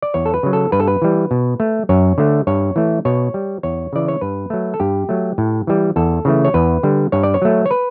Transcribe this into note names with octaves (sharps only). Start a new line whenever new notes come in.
D5
E2 C#5
A4
B4
C#3 F#3
A4
G2 B4
A4
B4
E3 G3
B2
A3
F#2 C#5
D3 A3
G2 C#5
E3 A3
B2 C#5
G3
E2 C#5
C#3 E3 D5
C#5
G2 B4
F#3 A3
A4
G2 G4
F#3 A3
A2
E3 G3
E2 A4
C#3 E3 A3
C#5
E2 B4
D3 G3
G2 C#5
D5
C#5
F#3 A3
C#5
B4